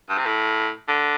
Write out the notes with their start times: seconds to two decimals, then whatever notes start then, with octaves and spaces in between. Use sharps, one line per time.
0.09 G2
0.18 C3
0.26 A2
0.88 D3